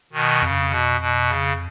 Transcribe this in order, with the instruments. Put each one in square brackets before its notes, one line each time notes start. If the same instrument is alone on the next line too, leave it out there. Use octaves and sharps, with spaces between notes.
[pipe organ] B2 D#3
[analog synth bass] F2 [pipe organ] C#3
[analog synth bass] F#2
F2
[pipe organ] B2
B2
C#3